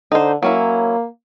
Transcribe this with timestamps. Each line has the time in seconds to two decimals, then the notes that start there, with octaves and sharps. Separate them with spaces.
0.12 D3 D#4 C5
0.43 F#3 A#3 C#4 E4